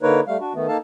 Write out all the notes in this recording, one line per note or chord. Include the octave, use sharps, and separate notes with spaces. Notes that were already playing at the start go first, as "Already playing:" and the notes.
D3 A#3 D#4 A#4 B4 C#5
G3 A3 F5
D4 F#4
D#3 A3 B3
A#3 D#4 A4 F5 A5